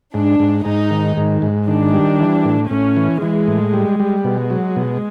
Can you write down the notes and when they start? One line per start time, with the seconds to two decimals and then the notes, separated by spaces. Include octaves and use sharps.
0.13 G#2 D4
0.40 G#2
0.65 G#2 D#4
0.91 D#3
1.17 G#2
1.42 G#2
1.68 D#3 D4
1.93 G3
2.20 E3
2.45 A2
2.70 A2 C#4
2.97 E3
3.22 E3 G#3
3.48 A2
3.74 G3
4.00 G3
4.24 B2 G#3
4.50 F#3
4.76 B2